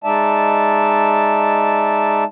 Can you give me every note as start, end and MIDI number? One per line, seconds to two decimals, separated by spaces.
0.04 2.24 56
0.04 2.24 63
0.04 2.24 74
0.04 2.24 76
0.04 2.24 81